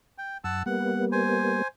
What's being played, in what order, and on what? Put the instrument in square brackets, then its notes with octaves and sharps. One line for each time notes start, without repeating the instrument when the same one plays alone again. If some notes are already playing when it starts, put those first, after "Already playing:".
[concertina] G5
[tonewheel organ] F#2 [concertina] F#5 A5 E6
[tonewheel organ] G3 A#3 B3 [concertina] F#5
[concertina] C5 G#5